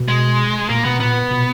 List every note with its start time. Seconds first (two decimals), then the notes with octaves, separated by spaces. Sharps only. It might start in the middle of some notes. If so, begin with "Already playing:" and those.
Already playing: B2
0.08 G#3
0.69 A#2 A#3
0.85 B2 B3
1.00 A#2 B3
1.31 B2